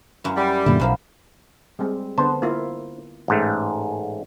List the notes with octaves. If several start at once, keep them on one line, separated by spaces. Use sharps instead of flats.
F#2 E4
G3
F#2 A#2 D3 E4
B1 F#2 F3 A#3
G3 G#3 C4
D3 B3 C5 A5
A#3 E4 F4
A1 G#2 A3